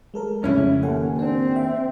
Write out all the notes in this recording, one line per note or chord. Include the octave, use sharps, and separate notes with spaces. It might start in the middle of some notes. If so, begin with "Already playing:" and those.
G#3 A4 A#4
F2 A2 C#3 C#4 E4
D#2 A4 F#5 G#5
C4 D4
E5